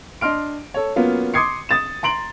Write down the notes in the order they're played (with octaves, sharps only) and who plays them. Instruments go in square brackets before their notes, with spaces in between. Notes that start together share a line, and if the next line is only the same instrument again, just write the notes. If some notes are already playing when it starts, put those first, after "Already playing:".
[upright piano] D4 D#5 C6 F6 D7
A4 C#5
F#3 A#3 B3 C#4 F4
C6 D6 D#6 G#6 C7 C#7
D#6 A6 E7
A#5 C6 D7 F#7